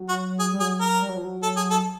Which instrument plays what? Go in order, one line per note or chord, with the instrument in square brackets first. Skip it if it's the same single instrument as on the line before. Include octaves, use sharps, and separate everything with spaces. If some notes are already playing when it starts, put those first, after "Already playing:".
Already playing: [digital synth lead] F#3
[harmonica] F#4
G#4
[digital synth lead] G3
[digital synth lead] F#3 [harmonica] G#4
[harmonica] A#4
[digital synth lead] G3
F#3
F3
F#3
[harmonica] A4
G#4
A4